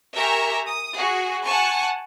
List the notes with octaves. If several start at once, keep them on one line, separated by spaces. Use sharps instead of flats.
G4 A#4 E5 G#5 A#5 C#6
D#6
F#4 G#4
F#5 G#5 A5 C#6